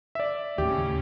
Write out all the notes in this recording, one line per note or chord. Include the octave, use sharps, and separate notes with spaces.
D5 E5
D#2 A2 C#3 C#4 G4